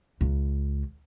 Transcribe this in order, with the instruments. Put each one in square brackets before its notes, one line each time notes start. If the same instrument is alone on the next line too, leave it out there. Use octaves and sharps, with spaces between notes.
[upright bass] C#2